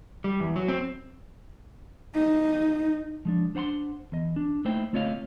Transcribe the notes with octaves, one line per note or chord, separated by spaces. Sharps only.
G3
E2
F#3
C4
D#4
F3 G#3 D4
D4 C5 F#5 B5 C6
E2 D#5
D4
A3 A#3 D#4 E4 C5 G5
A3 C4 F4 C#5 D#5 F5